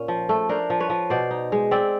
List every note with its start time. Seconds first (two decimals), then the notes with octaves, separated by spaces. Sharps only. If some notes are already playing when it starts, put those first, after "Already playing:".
Already playing: A#2 A#3 C#4
0.08 F3
0.29 A3
0.49 D4 A#4 C5
0.70 F3
0.80 B4 C#5
0.90 F3
1.10 B2 C5 D5
1.31 D#4
1.52 G#3
1.71 C4 D5 E5